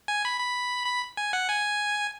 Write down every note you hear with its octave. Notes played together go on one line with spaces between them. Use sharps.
G#5
B5
B5
B5
G#5
F#5
G#5